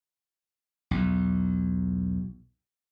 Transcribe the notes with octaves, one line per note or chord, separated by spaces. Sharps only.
B1 E2